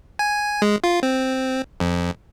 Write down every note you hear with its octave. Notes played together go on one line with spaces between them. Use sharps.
G#5
G#3
F4
C4
F2